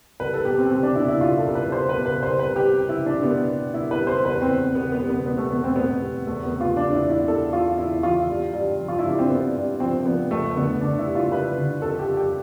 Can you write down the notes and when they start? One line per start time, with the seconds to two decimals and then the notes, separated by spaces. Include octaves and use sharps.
0.20 C2 B4
0.33 A4
0.45 B2 G4
0.58 C4
0.71 G3 C4
0.83 D4
0.95 B2 E4
1.08 E4
1.21 C2 F4
1.38 A4
1.47 C2
1.55 B4
1.72 G3 C5
1.89 B4
1.97 B2
2.06 B4
2.22 C2 C5
2.39 B4
2.47 C2
2.56 G4
2.73 C2
2.89 E4
2.98 G3
3.06 D4
3.23 B2 B3
3.49 B2
3.74 C2 E4
3.91 B4
3.99 G3
4.07 C5
4.25 E2 B4
4.42 C4
4.50 E2
4.75 B2 B3
4.92 B3
5.01 G3
5.09 B3
5.25 B2 B3
5.38 A3
5.51 E2 B3
5.64 C4
5.76 B2 B3
6.01 G3
6.27 E2 A3
6.44 B3
6.52 C3
6.61 F4
6.77 E2 D4
6.94 E4
7.03 E2
7.10 E4
7.28 E2 A4
7.53 E2 F4
7.78 E2 E4
8.03 E3 F4
8.29 G2
8.53 G2
8.80 F3
8.88 F4
8.99 E4
9.04 G2 D4
9.19 C4
9.30 G2 B3
9.55 G2
9.80 F3 C4
10.06 F3 B3
10.31 F2 A3
10.56 D3 B3
10.81 D3 D4
10.99 E4
11.07 G3
11.15 F4
11.32 G3 B4
11.58 D3
11.82 F2 A4
11.99 G4
12.08 G3
12.17 G4